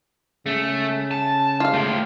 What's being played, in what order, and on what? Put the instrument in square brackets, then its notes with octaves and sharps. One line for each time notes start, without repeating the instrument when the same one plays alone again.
[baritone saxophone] C#3 [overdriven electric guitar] A3
[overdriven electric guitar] A5
[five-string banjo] F4 F5
[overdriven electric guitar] A3 G4